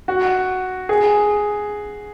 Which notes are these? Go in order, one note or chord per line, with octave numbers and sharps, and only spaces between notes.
F#4
G#4